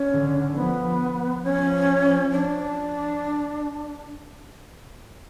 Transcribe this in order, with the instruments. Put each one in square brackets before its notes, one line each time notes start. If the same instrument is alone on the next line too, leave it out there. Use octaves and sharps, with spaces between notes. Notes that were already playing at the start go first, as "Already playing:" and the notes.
Already playing: [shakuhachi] C#4
[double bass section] D3
[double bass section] F3 [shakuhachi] B3
[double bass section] F3 [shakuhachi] C#4
[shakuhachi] D4